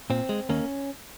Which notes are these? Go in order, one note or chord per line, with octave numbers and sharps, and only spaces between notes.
A#2 C4
G#3
D#2 A#3 C#4